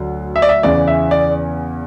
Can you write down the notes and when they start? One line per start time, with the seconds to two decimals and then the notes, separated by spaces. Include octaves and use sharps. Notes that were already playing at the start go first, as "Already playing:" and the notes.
Already playing: D2 D3 F#3
0.36 E5
0.42 D5
0.49 E5
0.63 E2 C#3 E3 D5
0.88 E5
1.11 D5